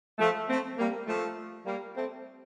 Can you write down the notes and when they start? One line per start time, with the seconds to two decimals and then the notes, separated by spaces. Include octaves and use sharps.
0.18 F3 A3
0.48 A3 C4
0.77 G3 A#3
1.07 F3 A3
1.65 G3 A#3
1.95 A3 C4